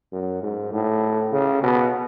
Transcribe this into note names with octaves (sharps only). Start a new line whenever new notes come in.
F#2
G#2
A2
C#3
B2